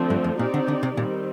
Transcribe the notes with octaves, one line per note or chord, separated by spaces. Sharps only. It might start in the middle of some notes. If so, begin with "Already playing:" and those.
Already playing: D3 F3 A3 C4
G2
F2
A#2 C4 D#4 G4 D5
D3
D3
C3
A#2 D#3 G3 C4